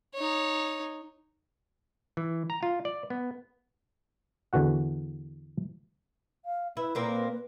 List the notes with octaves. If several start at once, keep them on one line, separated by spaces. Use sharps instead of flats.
D#4 C#5
E3
A#5
F4
D5
B3
E2 D3 E3 F#4 F#5
F5
E4 B4
A#2 A#3 C4